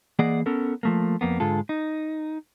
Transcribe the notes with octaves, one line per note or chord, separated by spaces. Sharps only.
E3 A#3 G#4 D5 D#5 F#5
B3 C#4 A4 A#4
F3 A3 A#3
F2 A#3 B3
G#2 D3 G#3 F4 A4
D#4